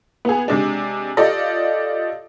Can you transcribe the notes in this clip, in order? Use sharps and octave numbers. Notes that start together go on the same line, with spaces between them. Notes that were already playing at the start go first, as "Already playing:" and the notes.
B3 G#4
C3 G#3 D4
F4 G4 A4 D5 D#5